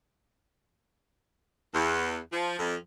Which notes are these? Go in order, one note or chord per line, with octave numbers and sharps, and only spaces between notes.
E2
F3
F2